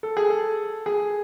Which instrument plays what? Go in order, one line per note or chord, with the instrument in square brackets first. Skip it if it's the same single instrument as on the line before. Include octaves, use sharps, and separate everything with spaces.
[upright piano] A4
G#4
A4
G#4